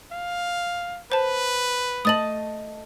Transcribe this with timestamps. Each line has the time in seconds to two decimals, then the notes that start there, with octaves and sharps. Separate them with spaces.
0.12 F5
1.12 B4 C5 A5
2.05 A3 D#5 A5 D#6 A6 F#7